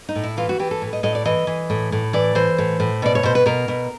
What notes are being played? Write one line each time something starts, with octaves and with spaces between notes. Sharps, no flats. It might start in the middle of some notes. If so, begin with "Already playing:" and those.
D#4
A2
E4
E3 F4
F#4
E3 G4
A4
A2
D#5
A2 D#5
D5
E3 D#5
E3
A2
A2
E3 D5
E3 C5
A2
A2
B2 D5
C#5
B2 C5
B4
B2 A#4
B2